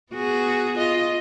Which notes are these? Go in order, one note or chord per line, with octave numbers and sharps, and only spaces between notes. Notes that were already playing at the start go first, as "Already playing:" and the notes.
B3 F#4 G#4
F4 D#5